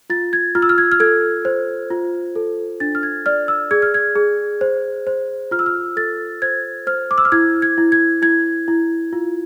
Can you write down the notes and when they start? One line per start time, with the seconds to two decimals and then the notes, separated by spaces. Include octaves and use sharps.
0.10 F4 A6
0.33 G#6
0.55 F4 F6
0.62 E6
0.69 F6
0.78 G#6
0.92 F6
1.00 A4 G#6
1.45 C5
1.90 F4
2.35 A4
2.80 D4 A6
2.95 F6
3.03 G#6
3.26 D5 F6
3.48 E6
3.71 G#4 G#6
3.82 F6
3.94 G#6
4.16 G#4
4.61 C5
5.07 C5
5.51 F4 F6
5.59 E6
5.66 F6
5.96 A4 A6
6.42 C5 G#6
6.87 C5 F6
7.11 D6
7.18 E6
7.25 F6
7.32 E4 G#6
7.62 G#6
7.78 E4
7.92 G#6
8.22 E4 G#6
8.68 E4
9.13 F4